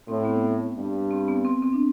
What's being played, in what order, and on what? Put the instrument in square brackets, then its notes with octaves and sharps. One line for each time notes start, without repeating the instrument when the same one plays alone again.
[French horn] A2 [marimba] C4
[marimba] B3
[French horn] G2
[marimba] C4
B3
C4
C4
D4